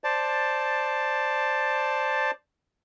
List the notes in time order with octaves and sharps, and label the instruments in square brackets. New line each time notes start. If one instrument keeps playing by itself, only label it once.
[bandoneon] C5 D5 A5